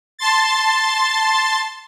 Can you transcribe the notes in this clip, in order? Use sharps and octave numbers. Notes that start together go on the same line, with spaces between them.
A5 C6 A6